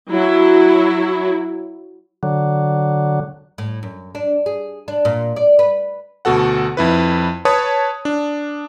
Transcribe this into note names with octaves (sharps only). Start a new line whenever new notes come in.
F#3 E4
D3 F#3
A2
F#2
D4
G#4
D4
A#2
D5
B4
D2 B2 F#4 A4 F#5
F2 E4 B4
B4 C#5 A5 D#6
D4